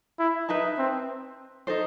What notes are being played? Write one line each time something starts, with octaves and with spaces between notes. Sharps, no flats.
E4
D#4 B4 E5 A5
C4
D#4 A4 C5